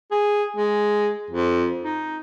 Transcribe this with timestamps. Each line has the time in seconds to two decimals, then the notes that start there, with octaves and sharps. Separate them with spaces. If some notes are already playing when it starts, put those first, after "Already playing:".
0.11 G#4
0.56 G#3
1.30 F2
1.83 D#4